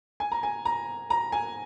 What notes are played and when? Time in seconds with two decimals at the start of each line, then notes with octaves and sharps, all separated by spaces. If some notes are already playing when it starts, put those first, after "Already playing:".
0.20 G#5
0.32 A#5
0.43 G#5
0.65 A#5
1.10 A#5
1.32 G#5